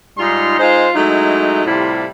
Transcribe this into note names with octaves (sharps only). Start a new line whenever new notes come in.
G#2 G3 D#4 F4 C6
G#3 D#4 F4 C5
F#3 G#3 A3 D#4 E4
A2 C3 G3 E4 F4